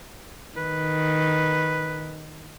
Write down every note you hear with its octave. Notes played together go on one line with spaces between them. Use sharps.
D#3 B4